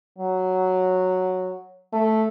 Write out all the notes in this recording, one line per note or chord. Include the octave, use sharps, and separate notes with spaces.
F#3
A3